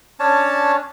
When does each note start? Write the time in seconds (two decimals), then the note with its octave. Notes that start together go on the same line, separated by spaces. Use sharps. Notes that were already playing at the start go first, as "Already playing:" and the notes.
0.20 C#4 D4 C#5 A5